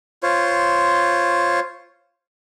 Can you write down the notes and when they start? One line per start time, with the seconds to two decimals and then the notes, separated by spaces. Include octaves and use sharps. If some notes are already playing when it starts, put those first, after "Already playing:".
0.23 F4 C5 C#5